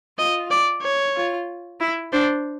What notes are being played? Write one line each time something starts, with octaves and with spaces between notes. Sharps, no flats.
F4 D#5
D5
C#5
F4
E4
D4 C5